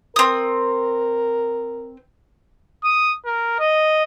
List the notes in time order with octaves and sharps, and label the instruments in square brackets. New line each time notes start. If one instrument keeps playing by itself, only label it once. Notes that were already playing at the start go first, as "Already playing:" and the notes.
[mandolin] C4 D#6 [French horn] A#4
[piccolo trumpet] D#6
A#4
D#5